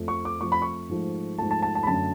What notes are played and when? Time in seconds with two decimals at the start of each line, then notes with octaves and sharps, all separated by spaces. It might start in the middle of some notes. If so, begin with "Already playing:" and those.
Already playing: F2 F3 A3
0.08 C#6
0.25 D6
0.41 F2 F3 A3 C#6
0.52 B5
0.62 C#6
0.89 G#2 F3 A3
1.38 G#2 F3 A3 A5
1.51 A5
1.62 A5
1.75 A5
1.83 B5
1.87 F#2 D3 F#3 A3 A5